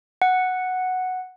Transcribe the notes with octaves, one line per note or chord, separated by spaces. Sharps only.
F#5